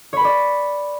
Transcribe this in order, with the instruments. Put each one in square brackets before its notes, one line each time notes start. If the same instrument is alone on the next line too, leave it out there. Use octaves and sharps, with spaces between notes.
[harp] C#5
B5
B4
D5